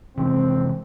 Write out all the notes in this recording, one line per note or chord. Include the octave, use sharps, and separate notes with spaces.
C3 E3 G#3 C4